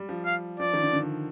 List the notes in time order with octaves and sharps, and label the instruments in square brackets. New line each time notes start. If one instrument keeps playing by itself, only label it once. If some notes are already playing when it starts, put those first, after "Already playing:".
Already playing: [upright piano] G3
F3
[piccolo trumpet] F5
[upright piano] F3 [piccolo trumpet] D5
[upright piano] D#3
D3
D3